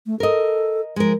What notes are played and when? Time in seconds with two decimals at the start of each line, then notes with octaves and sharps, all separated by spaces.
0.06 A3
0.20 A4 A#4 D#5
0.96 F3 G#3 A#4